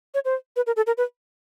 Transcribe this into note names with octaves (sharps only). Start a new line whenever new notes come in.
C#5
C5
B4
A#4
A4
A#4
B4